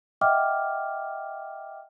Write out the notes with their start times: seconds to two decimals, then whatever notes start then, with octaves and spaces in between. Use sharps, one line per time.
0.21 D#5 E5 F#5 G5 D6 F6